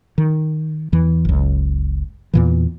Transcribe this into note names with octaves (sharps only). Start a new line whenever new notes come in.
D#3
E2 E3
F#1 C#2
E2 A#2 E3